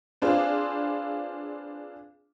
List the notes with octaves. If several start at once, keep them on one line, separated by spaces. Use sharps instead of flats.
C4 D4 F4 G#4 B4 C5